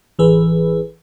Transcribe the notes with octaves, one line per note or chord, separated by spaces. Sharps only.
A1 E3 G#4 B4